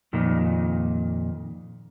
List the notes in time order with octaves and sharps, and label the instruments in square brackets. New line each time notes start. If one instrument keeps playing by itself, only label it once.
[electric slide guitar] F2 A#2 D#3